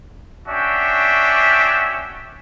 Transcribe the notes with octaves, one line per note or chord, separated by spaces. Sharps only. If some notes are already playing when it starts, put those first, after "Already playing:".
C#4 D4 F#4 E5 G5